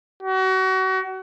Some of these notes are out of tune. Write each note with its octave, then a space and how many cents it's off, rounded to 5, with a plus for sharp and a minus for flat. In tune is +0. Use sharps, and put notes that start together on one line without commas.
F#4 +30